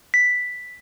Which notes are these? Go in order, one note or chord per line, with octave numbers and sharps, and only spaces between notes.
B6